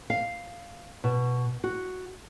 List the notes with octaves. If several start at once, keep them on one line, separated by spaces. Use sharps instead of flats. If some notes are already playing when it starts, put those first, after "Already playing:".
F5
B2
F#4